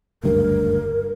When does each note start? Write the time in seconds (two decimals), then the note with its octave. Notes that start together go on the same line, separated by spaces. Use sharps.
0.23 F#1 D2 G2 A#4